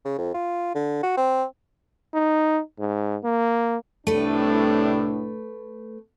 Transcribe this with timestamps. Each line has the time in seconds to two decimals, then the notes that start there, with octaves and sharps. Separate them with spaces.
0.05 C#3
0.18 F2
0.34 F4
0.75 D3
1.03 F#4
1.17 C4
2.14 D#4
2.79 G#2
3.24 A#3
4.07 C2 A2 A3 D4 B4